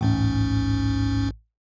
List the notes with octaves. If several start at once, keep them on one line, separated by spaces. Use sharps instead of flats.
A1 D2 G#2 C#4